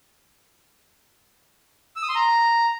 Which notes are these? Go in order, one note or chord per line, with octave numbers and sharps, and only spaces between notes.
E6
D#6
C6
A#5